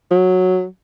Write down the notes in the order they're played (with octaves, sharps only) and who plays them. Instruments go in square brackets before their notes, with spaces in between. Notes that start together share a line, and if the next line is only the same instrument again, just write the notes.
[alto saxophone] F#3